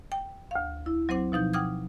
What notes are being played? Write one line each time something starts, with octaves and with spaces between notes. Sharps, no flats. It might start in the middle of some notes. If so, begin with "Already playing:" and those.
G5
D2 F5
E4
F#3 C4 C5 F#5 D6
B2 F3 D#4 G6
F#5 G5 D6 D#6 F6 G#6